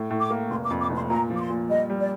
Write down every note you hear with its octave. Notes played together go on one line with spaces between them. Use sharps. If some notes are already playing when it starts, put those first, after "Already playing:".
Already playing: A2
A2
D6
A#3
F1 C6
D6
F2
D6
F1 C6
A#2 A#5
F3
D6
C6
A#2
G3 D#5
G3
D5